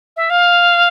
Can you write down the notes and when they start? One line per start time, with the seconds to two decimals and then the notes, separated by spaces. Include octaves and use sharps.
0.17 E5
0.30 F5